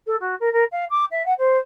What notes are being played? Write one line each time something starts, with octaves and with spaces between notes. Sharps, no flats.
A4
F#4
A#4
A#4
F5
D6
E5
F#5
C5